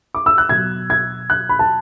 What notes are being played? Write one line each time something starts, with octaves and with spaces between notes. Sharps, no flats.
D6
E6
F#6
B2 F#3 G#6
G#6
F#6
B5
A5